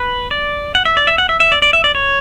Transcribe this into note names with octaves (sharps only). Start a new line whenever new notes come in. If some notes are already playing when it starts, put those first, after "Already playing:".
Already playing: B4
D5
F#5
E5
D5
E5
F#5
E5
E5
D5
D5
E5
D5
C#5